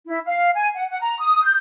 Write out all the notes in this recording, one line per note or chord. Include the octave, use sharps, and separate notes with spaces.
E4
F5
G#5
F#5
F#5
A#5
D#6
G6